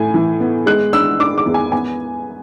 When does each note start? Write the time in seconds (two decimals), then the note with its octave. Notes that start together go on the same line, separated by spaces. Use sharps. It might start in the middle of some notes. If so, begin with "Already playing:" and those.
Already playing: A2 G#5
0.14 E3
0.40 B3
0.66 G#3 F#6
0.93 D4 E6
1.19 D4 D6
1.38 D6
1.46 E2
1.54 G#5
1.72 B3 G#5